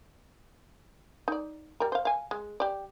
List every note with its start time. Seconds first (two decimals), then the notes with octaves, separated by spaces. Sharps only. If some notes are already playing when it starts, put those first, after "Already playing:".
1.28 D#4 D5
1.80 G3 A#4
1.92 C5 F5
2.05 F5 G#5
2.31 G#3
2.60 G4 D5